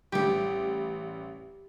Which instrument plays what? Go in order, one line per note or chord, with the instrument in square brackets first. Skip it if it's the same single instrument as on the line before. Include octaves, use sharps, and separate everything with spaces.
[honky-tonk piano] A1 G3 [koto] G4